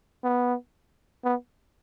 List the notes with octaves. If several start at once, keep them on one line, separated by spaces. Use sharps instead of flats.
B3
B3